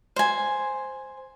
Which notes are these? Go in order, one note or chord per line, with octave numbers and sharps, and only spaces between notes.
C5 G#5